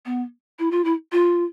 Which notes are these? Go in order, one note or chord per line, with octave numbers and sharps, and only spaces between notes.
B3
E4
F4
E4
F4